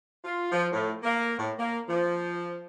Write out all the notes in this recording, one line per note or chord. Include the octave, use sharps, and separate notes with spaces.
F4
F3
A2
A#3
A2
A#3
F3